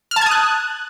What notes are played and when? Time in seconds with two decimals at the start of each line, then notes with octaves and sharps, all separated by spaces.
0.11 F6
0.16 A5
0.21 G#6
0.26 D#6
0.31 F#6